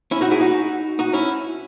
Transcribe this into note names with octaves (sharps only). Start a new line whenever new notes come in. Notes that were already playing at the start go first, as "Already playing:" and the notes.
C#4 E4
D#4 F#4
E4 G#4
D#4 F#4
D#4 F#4
C#4 E4